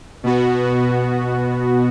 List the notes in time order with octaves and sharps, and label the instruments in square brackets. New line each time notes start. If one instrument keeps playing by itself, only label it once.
[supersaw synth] B2 B3 F#4